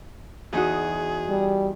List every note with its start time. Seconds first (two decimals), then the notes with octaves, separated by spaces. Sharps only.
0.53 E2 D#4 F#4 G#4
1.29 G3